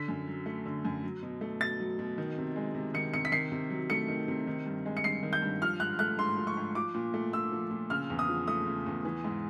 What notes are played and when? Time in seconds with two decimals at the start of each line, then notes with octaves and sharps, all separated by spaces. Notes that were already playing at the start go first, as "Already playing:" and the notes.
Already playing: D3 B6
0.08 F#2
0.27 F#3
0.46 A3
0.65 D3
0.85 F#2
1.04 F#3
1.23 B2
1.41 A3
1.60 B2 A6
1.80 F#3
1.99 B2
2.18 D#3
2.38 C3
2.56 G#3
2.75 C3
2.94 D#3 C#7
3.14 C3 C#7
3.25 B6
3.32 D#3 C7
3.52 C3
3.70 F#3
3.90 A3 C#7
4.08 D#3
4.28 C3
4.47 D#3
4.66 G2
4.86 G#3
4.97 C#7
5.04 G2 C7
5.23 D#3
5.33 G6
5.42 G2
5.62 F3 F6
5.80 G#2 F#6
5.99 A3 F#6
6.18 G#2 C6
6.37 F3
6.47 C#6
6.57 G#2
6.75 F3 D6
6.94 A#2
7.14 A3
7.33 A#2 E6
7.52 F3
7.71 A#2
7.90 C#3 F6
8.10 E2
8.19 D#6
8.29 F3
8.48 A3 D#6
8.66 C#3
8.86 E2
9.05 E3
9.24 G#2